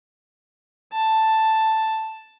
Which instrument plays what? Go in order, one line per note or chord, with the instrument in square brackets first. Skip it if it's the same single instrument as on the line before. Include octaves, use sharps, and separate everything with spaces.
[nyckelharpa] A5